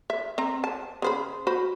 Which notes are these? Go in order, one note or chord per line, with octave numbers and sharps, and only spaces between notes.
E5
C4 A#5
A5
C#3 C5 B5
F#4 C5 B5